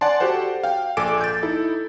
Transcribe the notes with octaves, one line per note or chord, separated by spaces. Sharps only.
D5 F#5 G#5 A5 C6
F#4 G4 A4 C5 F#5
F5 G5
A#1 A4 G#5 D6 D7 E7
G6 A6
D#4 E4 A4